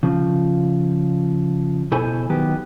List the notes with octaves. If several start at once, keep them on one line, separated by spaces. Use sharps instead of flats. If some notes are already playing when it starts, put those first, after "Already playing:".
C#3 F3
B2 E4 A4 C5 G#5
D#3 F#3 B3 G4